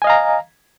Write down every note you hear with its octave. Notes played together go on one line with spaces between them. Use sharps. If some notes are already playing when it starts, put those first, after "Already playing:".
D#5 F5 G#5 A#5